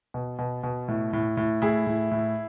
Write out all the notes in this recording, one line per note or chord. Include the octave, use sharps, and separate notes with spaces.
B2
B2
B2
A2
A2
A2
A2 E4 G#4
A2
A2